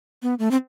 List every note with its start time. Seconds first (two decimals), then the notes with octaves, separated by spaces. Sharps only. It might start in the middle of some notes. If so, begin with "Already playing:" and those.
0.23 B3
0.39 A3
0.51 C4